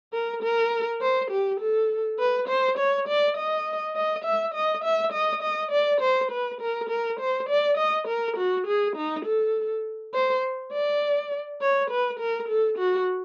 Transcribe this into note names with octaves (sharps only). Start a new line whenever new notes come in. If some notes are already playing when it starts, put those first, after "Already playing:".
A#4
A#4
C5
G4
A4
B4
C5
C#5
D5
D#5
D#5
E5
D#5
E5
D#5
D#5
D5
C5
B4
A#4
A#4
C5
D5
D#5
A#4
F#4
G#4
D#4
A4
C5
D5
C#5
B4
A#4
A4
F#4